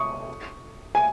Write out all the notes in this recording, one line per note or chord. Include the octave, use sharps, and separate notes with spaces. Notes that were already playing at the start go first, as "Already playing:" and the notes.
Already playing: C#6 D#6
G#5